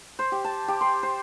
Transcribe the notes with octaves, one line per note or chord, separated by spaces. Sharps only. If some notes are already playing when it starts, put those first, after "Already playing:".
C5
G4
A5
G4
C6
C5